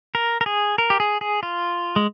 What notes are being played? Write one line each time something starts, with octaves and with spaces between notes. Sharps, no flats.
A#4
A#4
G#4
A#4
G4
G#4
G#4
F4
G#3